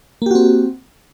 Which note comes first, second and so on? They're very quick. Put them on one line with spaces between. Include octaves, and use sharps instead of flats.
A#3 G4 F#4 C4